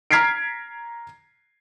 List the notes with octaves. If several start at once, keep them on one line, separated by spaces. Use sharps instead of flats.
A#5 F6 G#6 B6 C7 D7